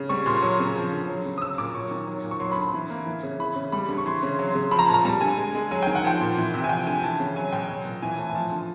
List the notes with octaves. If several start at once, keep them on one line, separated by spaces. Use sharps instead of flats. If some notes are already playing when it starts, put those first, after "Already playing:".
Already playing: C#3
G3 C#6
A#2 C6
F#3 C#6
C#3
F3
D3
F#3
C#3
D#6
F#3 E6
A#2 D6
F#3 C#6
D#3
F#3
A#2
C#6
F#3 C6
B5
D3
B5
E3
A#3
E3
C#3
E3 B5
C#3
G3 B5
D3
C#6
E3 C6
C#3
F#3 C6
C#3
F3 B5
A#5
A5
A#2
A#5
G3 A5
D3 G#5
G#3
G#3
F#3 G#5
D#3 G5
F#5
F3 G5
A#2
E3
C3
G#5
F3 G5
D3 G#5
E3 A5
C#3
F#3 G#5
B2 G5
F#3
A#2
E3 G#5
A2 A5
G#5
F3 A5
D3